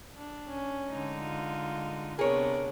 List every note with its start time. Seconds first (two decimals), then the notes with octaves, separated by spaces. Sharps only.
0.15 D4
0.48 C#4
0.89 D3 G#3 D#4
1.22 F4
2.19 C3 B3 D4 G#4 A#4 C#5